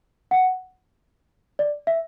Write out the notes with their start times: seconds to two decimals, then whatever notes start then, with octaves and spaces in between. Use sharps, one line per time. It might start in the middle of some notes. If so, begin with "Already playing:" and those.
0.31 F#5
1.59 D5
1.87 E5